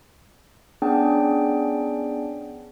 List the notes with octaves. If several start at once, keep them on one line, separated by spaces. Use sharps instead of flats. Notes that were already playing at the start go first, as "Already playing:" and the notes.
B3 C#4 D4 G#4 D5 G5